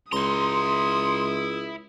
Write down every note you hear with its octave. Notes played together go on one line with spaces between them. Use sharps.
C#2 E4 A#5 C6 D#6